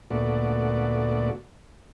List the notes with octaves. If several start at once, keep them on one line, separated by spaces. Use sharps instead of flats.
D2 A#2 A3 B3 F#4 D5